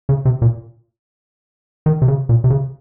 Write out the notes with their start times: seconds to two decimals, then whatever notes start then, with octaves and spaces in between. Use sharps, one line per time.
0.09 C#3
0.25 C3
0.42 A#2
1.86 D#3
2.02 C3
2.08 C#3
2.29 A#2
2.44 C3
2.50 C#3